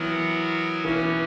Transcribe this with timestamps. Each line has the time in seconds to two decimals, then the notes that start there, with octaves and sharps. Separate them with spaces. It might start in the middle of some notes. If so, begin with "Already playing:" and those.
Already playing: E3 F#3 B3 F#4 A#4
0.84 B2 E3 A#3 C#4